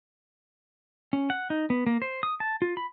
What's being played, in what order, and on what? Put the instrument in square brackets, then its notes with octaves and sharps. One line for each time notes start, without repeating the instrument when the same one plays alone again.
[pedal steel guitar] C#4
F#5
D#4
B3
A#3
C5
D#6
A5
F4
B5